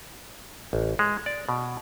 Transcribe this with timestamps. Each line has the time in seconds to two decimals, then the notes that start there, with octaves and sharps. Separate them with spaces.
0.73 A1
0.99 G#3
1.26 D5
1.49 B2